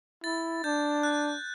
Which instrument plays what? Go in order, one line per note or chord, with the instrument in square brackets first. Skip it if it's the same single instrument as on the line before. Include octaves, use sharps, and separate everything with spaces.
[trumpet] E4 [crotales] A6
[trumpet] D4 [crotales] G6
[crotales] F#6